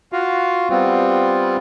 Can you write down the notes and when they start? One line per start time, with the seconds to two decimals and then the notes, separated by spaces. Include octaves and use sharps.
0.12 F4 F#4 F5
0.70 G3 B3 C4 F4